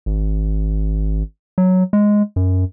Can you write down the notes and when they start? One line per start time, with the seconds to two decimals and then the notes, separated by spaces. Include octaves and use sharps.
0.06 G#1
1.58 F#3
1.93 G#3
2.36 F#2